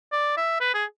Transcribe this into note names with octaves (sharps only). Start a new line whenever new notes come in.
D5
E5
B4
G#4